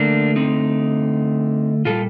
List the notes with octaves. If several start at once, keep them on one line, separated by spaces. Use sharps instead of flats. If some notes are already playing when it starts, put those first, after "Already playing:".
Already playing: D3 A3 A#3 D4
C4 D#4
A#2 G3 F4 A4